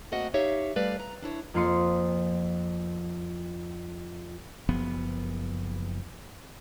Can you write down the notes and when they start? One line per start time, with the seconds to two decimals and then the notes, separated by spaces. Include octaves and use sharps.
0.12 A3 A#3 C4 F#4 D#5 F#5
0.34 D#4 G4 C#5 E5 F5
0.76 G3 A3 B4 D5 F5
0.99 A#5
1.23 D4 E4 C#5
1.54 F2 A#3 F4 C6 D#6 C#7
4.69 F#1 F3 B3